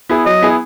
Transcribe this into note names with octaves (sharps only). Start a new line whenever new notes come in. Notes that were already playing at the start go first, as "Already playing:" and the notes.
B3 E4 G#4
F#3 D#5
B3 E4 G#4